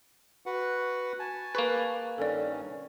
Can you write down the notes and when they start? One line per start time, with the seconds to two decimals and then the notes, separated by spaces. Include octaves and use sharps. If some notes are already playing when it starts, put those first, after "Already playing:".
0.46 F#4 B4 F#5
1.19 G#5 A5
1.55 A#3 G#4 B4 B5 C#6
2.18 G2 D#3 C#4 A4 D5